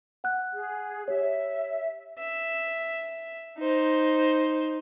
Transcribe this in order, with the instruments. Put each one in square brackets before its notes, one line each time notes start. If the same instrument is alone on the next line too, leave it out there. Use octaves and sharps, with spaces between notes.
[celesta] F#5 F#6
[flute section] G#4
[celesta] G4 C#5 [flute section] E5
[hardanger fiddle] E5
D#4 C5